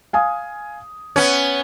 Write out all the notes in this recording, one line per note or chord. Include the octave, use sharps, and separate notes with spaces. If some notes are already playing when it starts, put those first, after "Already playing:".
F5 G#5 D#6
B3 C#4 G#6